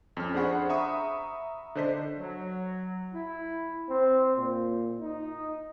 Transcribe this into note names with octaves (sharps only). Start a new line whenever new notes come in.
F2 C#4 F6
D4 G#4 C5 F#5 B5 C#6
E5 A#5 B5 C#6 D#6
D3 D4 C5 D#5 B6
F#3
E4
C4
A#2
D#4